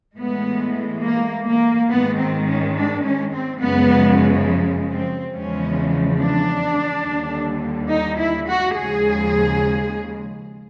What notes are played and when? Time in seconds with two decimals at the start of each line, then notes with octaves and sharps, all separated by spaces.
0.17 A2 E3 G#3 B3
1.03 A#3
1.47 A#3
1.89 G#2 D#3 G#3 B3
2.18 C4
2.47 C#4
2.76 D4
3.03 C#4
3.33 C4
3.61 F#2 C#3 F3 G#3 B3
4.90 C4
5.33 E2 C#3 F3 G#3 C#4
6.19 D4
7.05 D#2 D3 G3
7.89 D#4
8.19 E4
8.47 F#4
8.76 D#2 C#3 F3 G#3 G#4